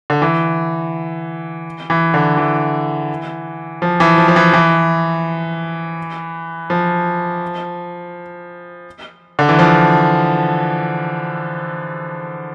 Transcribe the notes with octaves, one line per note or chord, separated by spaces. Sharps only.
D3
E3
E3
D3
E3
F3
E3
F3
F3
E3
E3
F3
D3
E3
F3